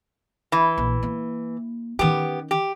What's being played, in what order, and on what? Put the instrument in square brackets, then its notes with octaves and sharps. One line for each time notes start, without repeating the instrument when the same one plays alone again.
[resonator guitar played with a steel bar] E3
[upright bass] A#1
A#3
[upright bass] D#3 C#4 [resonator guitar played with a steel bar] B3 G4
[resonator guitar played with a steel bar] G4